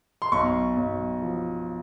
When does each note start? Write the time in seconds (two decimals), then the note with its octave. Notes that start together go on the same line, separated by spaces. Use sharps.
0.22 C6
0.32 B1 C#6
0.77 B1
1.22 F3